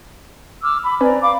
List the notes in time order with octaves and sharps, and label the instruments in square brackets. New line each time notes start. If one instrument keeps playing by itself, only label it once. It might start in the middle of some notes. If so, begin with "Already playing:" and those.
[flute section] D6 E6 F6
B5
[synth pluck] C4 B4 G#5 [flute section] D5 A#5
[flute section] F5 B5 D6